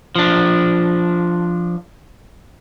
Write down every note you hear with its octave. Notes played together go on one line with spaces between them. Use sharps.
F3 D4